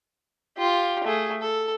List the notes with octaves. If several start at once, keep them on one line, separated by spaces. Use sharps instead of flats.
F4 G4
A3 G#4
A4